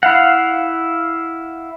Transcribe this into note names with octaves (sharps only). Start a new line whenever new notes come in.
E4 F5 F#5